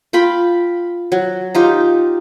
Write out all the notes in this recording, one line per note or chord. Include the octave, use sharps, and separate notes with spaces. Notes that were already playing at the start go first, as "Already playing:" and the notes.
F4 G5 B5
F#3
D#4 F4 G4